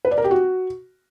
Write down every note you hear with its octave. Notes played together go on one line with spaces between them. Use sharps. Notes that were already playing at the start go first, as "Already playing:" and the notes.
B4
D5
A#4
G4
F#4